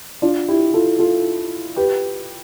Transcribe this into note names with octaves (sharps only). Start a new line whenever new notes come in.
D4 F4
E4 G4
F4 A4
F4 A4
G4 B4